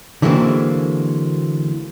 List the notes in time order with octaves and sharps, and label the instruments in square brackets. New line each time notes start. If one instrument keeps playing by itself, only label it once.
[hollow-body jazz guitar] D3 E3 F#3 G#3 A#3 C4